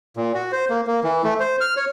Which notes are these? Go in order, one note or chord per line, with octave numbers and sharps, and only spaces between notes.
A#2
F#4
C5
A#3
A#3
E3
A3
C5
F6
C#5